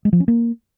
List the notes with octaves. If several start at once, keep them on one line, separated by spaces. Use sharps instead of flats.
G#3
F3
C#4
A#3